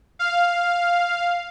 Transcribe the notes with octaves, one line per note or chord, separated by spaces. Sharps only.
F5